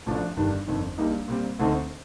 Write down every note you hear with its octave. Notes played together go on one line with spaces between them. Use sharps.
A1 A2 F3 A3 D4
G1 G2 D#3 G3 D4
G1 F2 D#3
A#1 A#2 G3 A#3 D#4
A#2 G3 C4
D2 D3 A3 C4 D#4